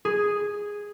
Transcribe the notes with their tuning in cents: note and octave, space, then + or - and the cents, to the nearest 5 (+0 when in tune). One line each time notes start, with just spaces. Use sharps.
G#4 -5